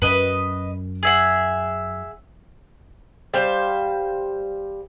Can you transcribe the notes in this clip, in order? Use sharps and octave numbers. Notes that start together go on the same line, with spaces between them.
F#2 C#4 B4 D#5
G#4 E5 F#5
G3 C5 F5